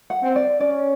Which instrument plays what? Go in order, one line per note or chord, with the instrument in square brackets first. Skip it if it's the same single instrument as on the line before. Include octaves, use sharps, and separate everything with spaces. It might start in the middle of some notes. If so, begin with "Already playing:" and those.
[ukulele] F#5
[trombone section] C4
[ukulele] D5
[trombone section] C#4 [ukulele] D5